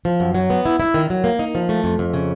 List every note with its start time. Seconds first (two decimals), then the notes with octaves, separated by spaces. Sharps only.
0.05 F3
0.20 F#2
0.35 F#3
0.50 B3
0.66 E4
0.80 E4
0.94 D#3
1.10 F#3
1.24 A#3
1.39 D#4
1.55 F3
1.69 A3
1.84 F2
1.99 F2
2.14 C#3